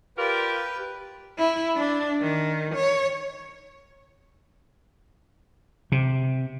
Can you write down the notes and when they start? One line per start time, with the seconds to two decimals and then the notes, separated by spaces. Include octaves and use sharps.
0.18 F4 G4 A#4 B4 D5
1.38 E4
1.76 D4
2.21 D#3
2.75 C#5
5.92 C3